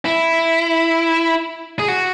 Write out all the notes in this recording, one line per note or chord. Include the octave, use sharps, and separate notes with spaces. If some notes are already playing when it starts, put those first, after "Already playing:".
E4
G#4
F#4